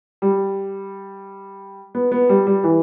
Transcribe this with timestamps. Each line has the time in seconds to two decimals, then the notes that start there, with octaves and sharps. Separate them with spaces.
0.22 G3
1.95 B3
2.12 B3
2.29 G3
2.47 G3
2.64 E3